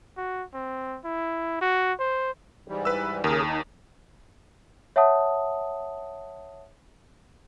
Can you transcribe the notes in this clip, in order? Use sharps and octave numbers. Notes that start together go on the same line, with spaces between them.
F#4
C4
E4
F#4
C5
G#2 E3 G3
B4 E6
D#2 C#3 G#4 A#4
D#4
C#5 E5 F#5 A5 D#6